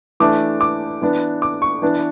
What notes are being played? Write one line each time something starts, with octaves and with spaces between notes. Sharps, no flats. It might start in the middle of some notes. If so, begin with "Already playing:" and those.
E3 A3 D4 D6
D6
E3 B3 D4
D6
C#6
E3 B3 D4